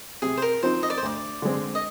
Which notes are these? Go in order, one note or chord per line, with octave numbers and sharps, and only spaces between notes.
C3 G#4
C5
A#4
F3 C4 D#4 C5
D#5
D5
C5
D2 D5
D3 G#3 C4
D#5